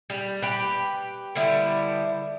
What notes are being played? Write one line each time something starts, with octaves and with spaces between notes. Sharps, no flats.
G3
G4 B4
D3 G3 B3 E4